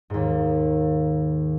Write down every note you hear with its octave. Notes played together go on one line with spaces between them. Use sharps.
D#2 G#2